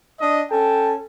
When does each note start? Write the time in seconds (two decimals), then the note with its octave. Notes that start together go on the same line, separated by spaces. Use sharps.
0.20 D4 D#5
0.50 C#4 A4 G5 A5